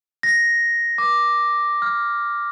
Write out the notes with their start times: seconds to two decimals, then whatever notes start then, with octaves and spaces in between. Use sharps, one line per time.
0.23 A#6
0.98 D6
1.82 F6